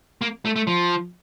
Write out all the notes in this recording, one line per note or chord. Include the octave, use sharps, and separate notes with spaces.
A#3
A3
A3
F3